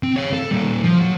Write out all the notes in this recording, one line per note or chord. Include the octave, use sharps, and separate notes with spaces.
C4
C#5 F5
A4
A#2 G3
F3
F#3